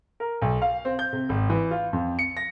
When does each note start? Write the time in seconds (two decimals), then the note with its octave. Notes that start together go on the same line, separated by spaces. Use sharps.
0.20 A#4
0.42 B1
0.62 F5
0.85 C4
0.99 G6
1.13 C3
1.29 G#1
1.50 E3
1.71 F4
1.93 F2
2.19 C#7
2.37 A#6